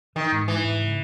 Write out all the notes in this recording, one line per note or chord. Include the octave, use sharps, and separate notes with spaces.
D#3 E3
G#2
E3 G#3
G#2
C#3